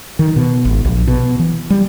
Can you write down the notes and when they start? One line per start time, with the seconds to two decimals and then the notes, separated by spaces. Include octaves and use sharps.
0.19 D#3
0.36 B2
0.65 G#1
0.85 A#1
1.07 B2
1.39 E3
1.70 G3